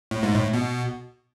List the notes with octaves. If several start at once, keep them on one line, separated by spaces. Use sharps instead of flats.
A2
G#2
A2
B2